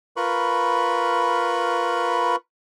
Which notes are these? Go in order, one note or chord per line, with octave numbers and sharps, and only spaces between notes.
F4 A#4 B4 B5 C#6